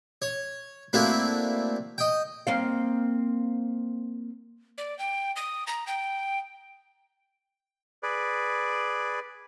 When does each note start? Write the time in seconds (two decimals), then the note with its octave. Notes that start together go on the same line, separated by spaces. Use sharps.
0.22 C#5
0.93 A3 A#3 C4 D4 E4 F#4
1.98 D#5 G5
2.47 A#3 C4 F5
4.78 D5
4.99 G5
5.36 D#6
5.67 A#5
5.87 G5
8.03 G#4 B4 D5